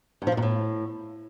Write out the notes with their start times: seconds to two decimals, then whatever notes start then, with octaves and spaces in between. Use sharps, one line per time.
0.22 G2
0.27 F3
0.32 C3
0.37 A#2
0.42 A2